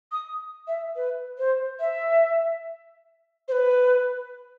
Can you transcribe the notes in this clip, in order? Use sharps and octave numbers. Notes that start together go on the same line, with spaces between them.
D#6
E5
B4
C5
E5
C5
B4